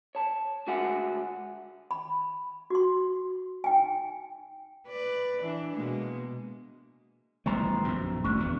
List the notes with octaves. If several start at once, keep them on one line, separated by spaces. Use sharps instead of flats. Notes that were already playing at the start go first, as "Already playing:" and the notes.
C#5 A5
D2 G#3 F#4 E5 F#5 G#5
B5
F#4 C6
D#4 G5 G#5
B4 D5
E3 D4
B2 G#3 A#3
A1 D#3 G3 B3 C5 A#5
A#1 F#2
G1 D2 C#4 D4
E2 B3